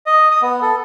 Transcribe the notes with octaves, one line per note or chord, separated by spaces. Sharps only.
D#5
D#6
B3
A4